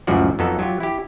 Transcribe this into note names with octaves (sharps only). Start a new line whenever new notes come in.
C#2 F#2 A2 F3 F#4 D5
F2 F#3 B3 D#4 A4
F#3 F4 G4
E4 G4